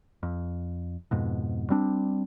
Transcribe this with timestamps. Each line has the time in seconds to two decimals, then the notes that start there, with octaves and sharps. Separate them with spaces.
0.23 F2
1.11 F2 G#2 B2
1.70 G3 C4 D4